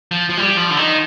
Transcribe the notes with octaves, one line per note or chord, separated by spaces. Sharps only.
F3
F3
G3
F3
D3
D#3